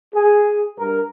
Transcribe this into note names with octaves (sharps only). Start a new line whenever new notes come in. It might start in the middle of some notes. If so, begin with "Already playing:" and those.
G#4
G2 A#4